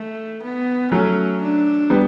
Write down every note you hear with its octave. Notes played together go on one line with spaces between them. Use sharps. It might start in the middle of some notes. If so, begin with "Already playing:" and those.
Already playing: A3
B3
F#3 A3 C#4
D4
G3 B3